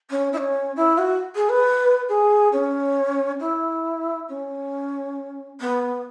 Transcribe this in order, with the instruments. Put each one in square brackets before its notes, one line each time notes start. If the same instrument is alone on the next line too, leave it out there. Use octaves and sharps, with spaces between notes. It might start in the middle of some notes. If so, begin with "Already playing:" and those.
[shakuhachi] C#4
E4
C#4
E4
F#4
G#4
B4
G#4
C#4
E4
C#4
B3